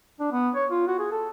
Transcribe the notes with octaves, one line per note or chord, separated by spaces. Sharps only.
D4
B3
C#5
F4
F#4
G#4
A4